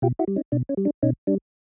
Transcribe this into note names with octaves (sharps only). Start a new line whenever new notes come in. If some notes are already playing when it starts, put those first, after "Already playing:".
B2 F4 G4
E4 F#4
G3
C#4 D#4
B2 D4
C#4
G3
D4
B2 C#4 D#4
G3 D4